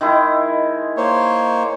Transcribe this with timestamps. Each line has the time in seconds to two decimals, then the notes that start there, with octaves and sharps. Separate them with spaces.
0.01 D#3 G#3 E4
0.97 A#3 C5 C#5